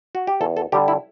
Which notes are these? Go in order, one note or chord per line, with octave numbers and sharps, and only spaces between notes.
F#4
G4
E2 A4
A4
D3 G3 G4
E4